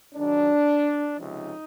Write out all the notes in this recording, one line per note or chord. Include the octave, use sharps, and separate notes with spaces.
G#2 D#3 F#3 D4
C#2 C3 F3 D#4